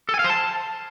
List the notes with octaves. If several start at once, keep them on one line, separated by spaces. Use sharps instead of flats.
A4
G#5
F5
C5
A5